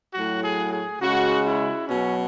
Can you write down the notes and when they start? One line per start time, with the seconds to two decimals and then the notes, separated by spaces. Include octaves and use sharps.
0.14 A2 F#3 F#4
0.44 G#4
0.72 G#4
1.01 C#3 G#3 F#4
1.45 E4
1.88 B2 F#3 C#4